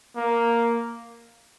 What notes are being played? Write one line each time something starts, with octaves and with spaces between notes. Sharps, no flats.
A#3